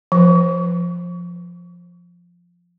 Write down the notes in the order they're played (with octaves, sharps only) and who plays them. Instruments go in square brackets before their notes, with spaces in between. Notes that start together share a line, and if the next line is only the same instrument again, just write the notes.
[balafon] F3 B4